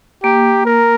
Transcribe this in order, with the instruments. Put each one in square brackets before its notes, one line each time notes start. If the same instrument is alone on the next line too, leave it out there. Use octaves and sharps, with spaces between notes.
[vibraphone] A#3 [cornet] G4
[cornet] A#4